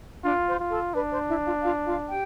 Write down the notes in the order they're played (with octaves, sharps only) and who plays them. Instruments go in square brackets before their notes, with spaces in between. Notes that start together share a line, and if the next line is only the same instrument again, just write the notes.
[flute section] D4 D5 [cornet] F4
[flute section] C5
[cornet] F4
[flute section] A4
[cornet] D4 [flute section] B4
[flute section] C5
E4 E5
F4 F5
F4 F5
F4 F5
G4 G5